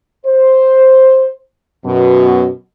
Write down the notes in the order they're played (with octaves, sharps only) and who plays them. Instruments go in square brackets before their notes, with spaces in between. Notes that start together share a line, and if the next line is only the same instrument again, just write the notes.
[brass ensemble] C5
F#2 B2